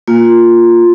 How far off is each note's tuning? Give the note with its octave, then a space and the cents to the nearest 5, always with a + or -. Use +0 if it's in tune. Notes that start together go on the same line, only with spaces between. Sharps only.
A#3 +0 F4 +0